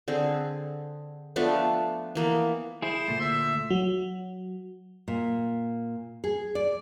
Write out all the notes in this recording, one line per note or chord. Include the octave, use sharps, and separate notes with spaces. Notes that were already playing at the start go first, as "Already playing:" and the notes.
D3 C4 G#4
F3 A3 B3 D4
E3 A#3 B3
E4 G#4 C5
D2 A#2 A3
E5
F#3
A#2
G#4
D5